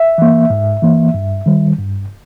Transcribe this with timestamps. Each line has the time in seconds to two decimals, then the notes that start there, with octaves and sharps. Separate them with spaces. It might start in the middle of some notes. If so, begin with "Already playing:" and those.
Already playing: E5
0.18 E3 A#3
0.50 G#2
0.82 E3 A#3
1.14 G2
1.46 D#3 G3
1.78 G2